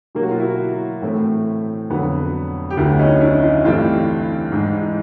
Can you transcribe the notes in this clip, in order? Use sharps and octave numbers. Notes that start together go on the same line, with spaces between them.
B2 F#3 A#3 G4
F#4
F4
E4 F#4
A2 E3 A3 C4
F2 D3 F#3 B3
G4
D2 D3 F#3 B3 E4 F#4
C#4 D#4
D4 E4
D#4 F4
G2 E3 A3 C4 F4 G4
G#2 E3 G#3